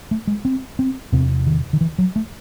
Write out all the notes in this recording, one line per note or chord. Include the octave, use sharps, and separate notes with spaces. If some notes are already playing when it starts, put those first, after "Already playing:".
A3
G#3
C4
C4
E2 C3 C4
D#3
D#3
E3
F#3
A3